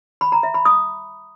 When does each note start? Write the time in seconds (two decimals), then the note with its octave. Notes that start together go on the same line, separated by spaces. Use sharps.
0.21 B5
0.32 A#5
0.43 E5
0.54 B5
0.65 D#6